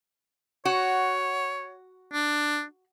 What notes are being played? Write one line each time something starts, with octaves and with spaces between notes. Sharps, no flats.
F#4 C#5
D4